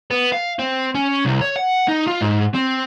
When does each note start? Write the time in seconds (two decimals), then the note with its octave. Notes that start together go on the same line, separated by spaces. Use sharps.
0.11 B3
0.32 F5
0.59 C4
0.95 C#4
1.25 C2
1.41 C#5
1.56 F#5
1.89 D#4
2.08 F4
2.22 G#2
2.55 C4